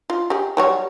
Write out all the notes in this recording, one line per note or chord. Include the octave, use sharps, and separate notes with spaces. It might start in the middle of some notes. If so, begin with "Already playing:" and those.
F4
G4 G#4
F#3 G3 C#5